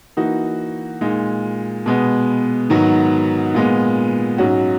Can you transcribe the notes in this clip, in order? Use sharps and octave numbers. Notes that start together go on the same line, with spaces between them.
E3 A#3 D#4 F#4
A#2 G#3 D#4
B2 G#3 B3
G#2 D#3 F#3 B3 F#4
A#2 G#3 B3
G#2 F#3 C#4 F#4